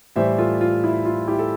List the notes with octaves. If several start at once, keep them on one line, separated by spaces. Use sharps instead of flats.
A2 E3 G3 C5 E5
F4 A4
F4
E4
F4
E4 G4
A4